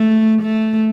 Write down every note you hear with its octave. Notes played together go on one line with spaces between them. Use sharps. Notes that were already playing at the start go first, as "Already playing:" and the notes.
Already playing: A3
A3